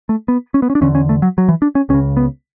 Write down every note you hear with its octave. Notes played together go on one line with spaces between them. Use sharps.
A3
B3
C#4
B3
C#4
D4
E2 D3 C#4
C#4
A3
F#3
F#3
E3
D4
C#4
C#2 C#3 C#4
B3